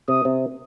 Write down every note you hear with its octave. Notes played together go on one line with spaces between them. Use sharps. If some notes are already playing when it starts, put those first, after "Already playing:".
C3 D#6
C3